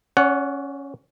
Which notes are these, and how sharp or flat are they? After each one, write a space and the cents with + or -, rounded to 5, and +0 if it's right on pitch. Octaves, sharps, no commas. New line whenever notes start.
C#4 +0 D5 -45 F#5 +0